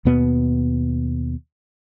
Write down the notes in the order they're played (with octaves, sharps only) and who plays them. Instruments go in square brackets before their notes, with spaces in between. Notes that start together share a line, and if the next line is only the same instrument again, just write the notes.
[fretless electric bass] D#2 B2 B3